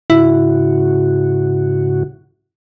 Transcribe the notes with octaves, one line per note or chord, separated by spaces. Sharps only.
G#2 C#3 E4 F#4